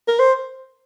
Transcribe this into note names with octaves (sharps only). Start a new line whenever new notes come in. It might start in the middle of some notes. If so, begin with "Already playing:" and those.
A#4
C5